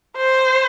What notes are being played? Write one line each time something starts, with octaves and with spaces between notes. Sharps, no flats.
C5